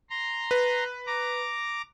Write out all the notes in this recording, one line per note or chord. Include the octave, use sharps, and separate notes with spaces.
A#5 C6
B4
A#5 D6